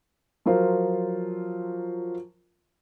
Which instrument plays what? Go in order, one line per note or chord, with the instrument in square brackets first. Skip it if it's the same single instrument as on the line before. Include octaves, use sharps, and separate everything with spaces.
[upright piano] F3 F#3 F4 A#4 C5